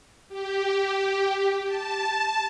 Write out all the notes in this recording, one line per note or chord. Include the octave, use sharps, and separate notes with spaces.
G4
A5